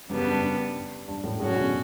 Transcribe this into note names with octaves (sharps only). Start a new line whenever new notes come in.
F#2 C#3 G3 B3 D4
G2
G2
G2
G2
F#2 A2
A2 C#3 F#3 C#4 F#4
C#3
B2 D3